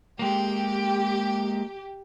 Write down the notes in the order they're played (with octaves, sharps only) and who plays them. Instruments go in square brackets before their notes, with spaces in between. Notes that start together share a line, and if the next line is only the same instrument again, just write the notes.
[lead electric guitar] G#3 A#3 [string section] G4